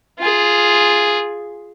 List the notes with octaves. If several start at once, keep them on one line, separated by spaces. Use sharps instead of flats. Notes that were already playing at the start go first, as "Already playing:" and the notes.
F4 G#4